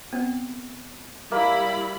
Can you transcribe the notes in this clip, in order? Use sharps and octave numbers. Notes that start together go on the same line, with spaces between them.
B3 C4
G3 A#3 E4 B5